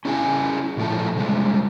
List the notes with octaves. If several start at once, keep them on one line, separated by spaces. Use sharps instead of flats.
C#4 E4 G#4 G5 G#5
A#2 F3 A3 E4 A4
C3 G3 G#3